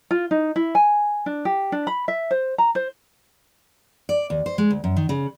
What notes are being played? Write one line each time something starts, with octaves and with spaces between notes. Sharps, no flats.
F4
D#4
E4
G#5
D4
G4
D4
B5
E5
C5
A#5
C5
D5
D#2
C5
G#3
D2
F#2
D#3
C#3